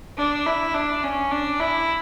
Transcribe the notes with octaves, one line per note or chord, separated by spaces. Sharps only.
D4
E4
D4
C#4
D4
E4